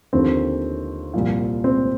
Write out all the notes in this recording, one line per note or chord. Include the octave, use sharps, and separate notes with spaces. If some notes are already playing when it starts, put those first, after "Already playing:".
D#2 D3 F3 C4
C2 A#2 F3
C4